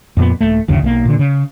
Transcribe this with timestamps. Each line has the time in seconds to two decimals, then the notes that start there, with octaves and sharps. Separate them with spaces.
0.17 F2 A#2 B3
0.41 D#1 A3
0.68 F#1 D2 C#3 E3
0.82 B1 G#3 A#3
1.05 A#2 D3
1.19 C#3